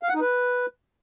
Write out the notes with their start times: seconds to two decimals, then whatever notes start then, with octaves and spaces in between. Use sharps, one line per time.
0.03 F5
0.09 F#5
0.15 D#4
0.21 B4